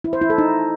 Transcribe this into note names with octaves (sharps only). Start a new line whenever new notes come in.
E4
C5
E4
A4
D#4